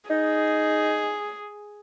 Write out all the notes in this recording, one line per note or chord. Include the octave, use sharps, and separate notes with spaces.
D#4 G#4